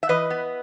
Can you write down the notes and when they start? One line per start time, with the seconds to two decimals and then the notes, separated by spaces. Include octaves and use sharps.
0.03 E5
0.09 E3 B4 D#5
0.30 B3